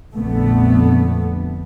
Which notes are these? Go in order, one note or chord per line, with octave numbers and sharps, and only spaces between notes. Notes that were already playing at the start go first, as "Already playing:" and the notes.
A#1 F2 D3 A3 B3